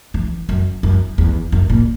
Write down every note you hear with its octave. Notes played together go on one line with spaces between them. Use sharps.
E3
F#2
F#2
E2
F#2
A#2